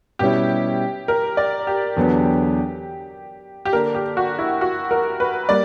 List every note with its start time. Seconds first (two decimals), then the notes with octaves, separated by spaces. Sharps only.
0.19 B2 G3 C#4 E4 G4
1.08 A#4
1.37 D5
1.67 G4
1.96 E2 D3 F#3 B3 D4
3.65 G4
3.72 D3 A#3 D4 A#4
3.95 G4
4.17 F#4
4.39 E4
4.61 F#4
4.91 A#4
5.20 B4
5.49 G3 A#3 D5